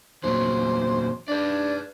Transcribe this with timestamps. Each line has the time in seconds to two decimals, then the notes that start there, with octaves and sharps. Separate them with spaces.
0.24 E2 A#2 F#3 C5
1.28 D4 B4 D5